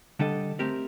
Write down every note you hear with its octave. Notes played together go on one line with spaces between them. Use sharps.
D3 G3 D4 A4 D#5
A3 C4 G4 A#4